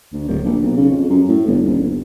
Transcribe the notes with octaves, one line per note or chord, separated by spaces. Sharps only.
D2
D1
A#1
B1
C#3
F2
F#2
A2
G1
D#1
G1